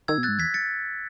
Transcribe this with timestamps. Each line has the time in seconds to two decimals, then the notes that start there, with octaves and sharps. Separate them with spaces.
0.08 D#3 E6 G#6
0.18 B2
0.23 F#6 A6
0.28 G#2
0.39 E2 G#6 B6
0.54 A6 C#7